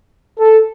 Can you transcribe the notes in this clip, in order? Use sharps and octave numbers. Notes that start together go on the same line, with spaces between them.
A4